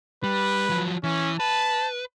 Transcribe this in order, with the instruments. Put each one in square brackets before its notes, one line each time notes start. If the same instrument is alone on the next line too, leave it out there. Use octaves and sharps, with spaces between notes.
[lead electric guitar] G3 [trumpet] B4
[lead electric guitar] F3 F#3
[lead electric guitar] E3 [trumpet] C#4
[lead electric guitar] B4 [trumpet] A5